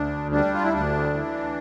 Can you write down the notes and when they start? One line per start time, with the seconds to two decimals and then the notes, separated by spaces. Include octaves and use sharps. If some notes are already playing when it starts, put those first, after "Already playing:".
Already playing: D2 D4
0.32 G3 D4
0.54 F4
0.64 E4
0.73 D2 D4
1.14 E3